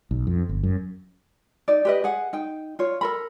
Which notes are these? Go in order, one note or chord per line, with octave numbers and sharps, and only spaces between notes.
B1
F2
G1
F#2
D#4 D5
G4 B4 D#5
G#4 F#5
D#4 G5
F4 C#5
A4 A#4 B5